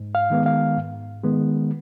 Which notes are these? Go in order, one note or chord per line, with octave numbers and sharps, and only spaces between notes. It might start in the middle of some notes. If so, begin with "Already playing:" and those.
Already playing: G#2
F5
D#3 G#3 B3
F5
G#2
D#3 G#3 B3